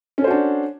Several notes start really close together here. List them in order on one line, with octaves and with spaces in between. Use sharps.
C#4 A4 C5 F#4 D4